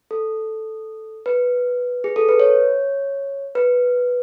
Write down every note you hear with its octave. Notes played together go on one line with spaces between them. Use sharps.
A4
B4
G#4
A4
B4
C#5
B4